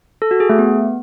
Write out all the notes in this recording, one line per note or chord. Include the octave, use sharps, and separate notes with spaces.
A4
F#4
G#4
A3
B3